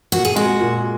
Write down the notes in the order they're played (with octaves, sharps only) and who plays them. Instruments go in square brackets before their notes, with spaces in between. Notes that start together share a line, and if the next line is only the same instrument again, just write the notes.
[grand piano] A#2 [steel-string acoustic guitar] F#4
[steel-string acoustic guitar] G#4
[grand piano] G#3 [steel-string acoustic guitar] F#4
[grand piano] A#2